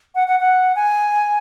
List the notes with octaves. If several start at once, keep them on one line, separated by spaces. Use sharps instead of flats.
F#5
F#5
F#5
G#5